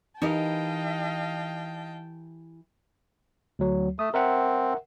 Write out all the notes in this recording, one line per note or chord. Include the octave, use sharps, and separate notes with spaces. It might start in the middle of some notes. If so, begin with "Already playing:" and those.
E3 D#4 G4 A#4 D#5 F5 G5 A5
D2 F#3
A3 D#6
C4 A#4 E5 F#5